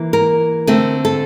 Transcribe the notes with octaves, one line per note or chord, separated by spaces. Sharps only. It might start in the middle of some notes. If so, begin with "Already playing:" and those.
Already playing: E3 A#3
A#4
D3 A3 C4
A4